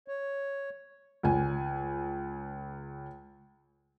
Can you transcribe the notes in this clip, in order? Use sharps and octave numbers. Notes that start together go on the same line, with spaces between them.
C#5
C#2 G#5